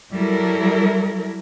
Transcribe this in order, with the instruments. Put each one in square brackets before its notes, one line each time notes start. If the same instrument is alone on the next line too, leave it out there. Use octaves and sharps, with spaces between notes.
[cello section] F#3 G3 E4 A4 A#4